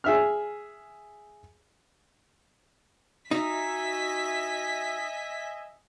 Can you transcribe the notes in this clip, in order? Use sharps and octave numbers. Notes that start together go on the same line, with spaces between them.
G#4 E5 F6
D#4 F#4 D#5 E5 G#5 B6